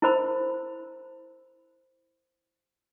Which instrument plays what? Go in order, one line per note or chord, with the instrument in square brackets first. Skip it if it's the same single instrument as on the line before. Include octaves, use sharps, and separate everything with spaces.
[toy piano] E4 A#4 C5 B5